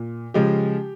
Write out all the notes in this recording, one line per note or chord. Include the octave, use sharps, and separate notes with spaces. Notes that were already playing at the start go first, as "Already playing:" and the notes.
Already playing: A#2
C#3 F3 G#3 G4